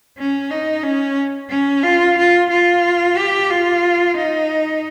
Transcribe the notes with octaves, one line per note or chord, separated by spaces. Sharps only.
C#4
D#4
C#4
C#4
F4
F4
F4
G4
F4
D#4